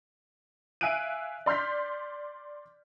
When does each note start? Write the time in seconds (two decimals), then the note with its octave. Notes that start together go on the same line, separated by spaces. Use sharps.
0.81 E5 F5 G#5 F#6 D7 D#7
1.46 D5 C6 F6 G6 B6